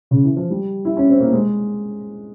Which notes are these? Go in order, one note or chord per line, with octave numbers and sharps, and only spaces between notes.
C#3
E3
F3
G3
E4
C#4
C4
A#3
G#3